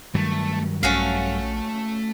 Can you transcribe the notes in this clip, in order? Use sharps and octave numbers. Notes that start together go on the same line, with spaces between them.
G2 D#3 F#3 A3
A#1 A3 C#4 F#4 F5